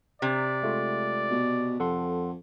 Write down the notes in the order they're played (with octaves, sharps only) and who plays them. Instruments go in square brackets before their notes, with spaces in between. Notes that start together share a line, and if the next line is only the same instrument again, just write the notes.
[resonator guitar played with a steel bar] C3 [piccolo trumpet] D5
[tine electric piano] G#3 A3 F4
[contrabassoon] B2
[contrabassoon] F2 [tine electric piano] A4 F#5 C6